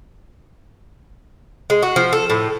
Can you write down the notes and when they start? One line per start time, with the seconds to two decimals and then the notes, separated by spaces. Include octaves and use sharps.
1.70 G#3
1.83 F#4
1.96 F3
2.13 A4
2.30 A2